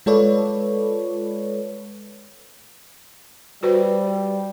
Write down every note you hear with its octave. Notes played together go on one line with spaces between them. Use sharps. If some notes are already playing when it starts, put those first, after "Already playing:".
G#3 F4 A4 B4 C#5 D5
G3 F#4 B4 C5